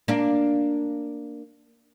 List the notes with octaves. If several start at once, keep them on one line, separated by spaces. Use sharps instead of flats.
A#3 D4